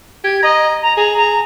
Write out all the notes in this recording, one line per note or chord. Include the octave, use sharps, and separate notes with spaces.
G4 G#6
D#5 A#5
A#5
G#4 A#5
A#5